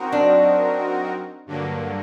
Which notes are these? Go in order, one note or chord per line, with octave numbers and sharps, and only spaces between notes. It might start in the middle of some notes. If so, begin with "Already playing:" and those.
Already playing: F#3 C4 D#4 F#4 A#4
D4
G2 D3 F#3 A#3